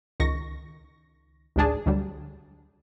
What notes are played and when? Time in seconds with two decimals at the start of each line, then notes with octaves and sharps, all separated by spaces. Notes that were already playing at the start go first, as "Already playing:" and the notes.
0.20 C#2 D#3 C#6 A#6
1.56 A1 D2 G#2 D4 G#4 A5
1.86 D2 D3 F#3 G3